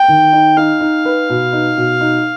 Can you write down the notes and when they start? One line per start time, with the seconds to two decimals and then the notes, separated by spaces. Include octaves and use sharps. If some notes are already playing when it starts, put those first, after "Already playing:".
Already playing: G5
0.08 D#3
0.32 D#4
0.57 D#4 F5
0.81 D#4
1.05 B4
1.30 B2
1.53 D#4
1.77 B2
2.01 D#4